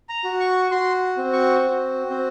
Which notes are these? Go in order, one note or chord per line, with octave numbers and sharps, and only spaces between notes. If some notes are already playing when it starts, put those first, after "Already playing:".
A#5
F#4
C#6
F#4 C6
C4
C#6
F#4
C4